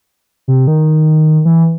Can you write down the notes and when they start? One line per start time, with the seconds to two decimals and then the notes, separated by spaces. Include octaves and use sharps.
0.48 C3
0.67 D#3
1.45 E3